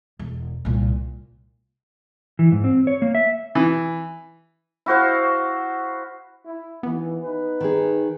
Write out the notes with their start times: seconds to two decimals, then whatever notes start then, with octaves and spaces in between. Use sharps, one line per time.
0.19 E1
0.65 C2 A#2
2.39 E3
2.52 G#2
2.64 C4
2.87 C#5
3.02 A#3
3.15 E5
3.55 E3
4.86 E4 F#4 C5 F5
6.45 E4
6.83 D#2 E3 B3
7.24 D#4 B4
7.60 D#3 G#4